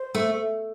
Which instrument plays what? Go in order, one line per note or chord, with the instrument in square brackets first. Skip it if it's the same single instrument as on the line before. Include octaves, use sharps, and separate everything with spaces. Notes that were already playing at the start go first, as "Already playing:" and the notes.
Already playing: [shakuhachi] C5
[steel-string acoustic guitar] A3